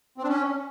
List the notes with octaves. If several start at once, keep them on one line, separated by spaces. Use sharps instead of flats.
C4
D4
C#4